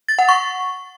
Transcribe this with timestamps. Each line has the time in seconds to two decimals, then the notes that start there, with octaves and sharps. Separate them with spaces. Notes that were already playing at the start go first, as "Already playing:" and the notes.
0.08 A6
0.19 F#5
0.29 C#6